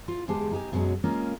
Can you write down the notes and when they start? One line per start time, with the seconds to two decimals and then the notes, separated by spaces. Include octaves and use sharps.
0.08 F4
0.28 E2 D3 G#3 G4 G#4 A5
0.51 D#4 G4 G#5
0.72 F#2 B2 F#3 G#3 C#4
1.04 G#3 A#3 C#4 F4 A#4